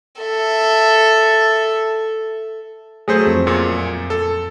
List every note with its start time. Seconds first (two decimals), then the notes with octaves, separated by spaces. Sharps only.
0.21 A4 E5
3.08 F#3 A3 G#4 C5
3.27 F2
3.47 F#2 A#2
4.10 A4